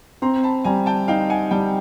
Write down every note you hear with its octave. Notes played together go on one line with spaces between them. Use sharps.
C4 A#5 C6
A5 B5
G3 G#5 A#5
G5 A5
D#4 F5 G5
F#5 G#5
G3 G5 A5